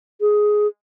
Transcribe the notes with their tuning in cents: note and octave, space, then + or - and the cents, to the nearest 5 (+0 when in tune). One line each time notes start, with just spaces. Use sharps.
G#4 +10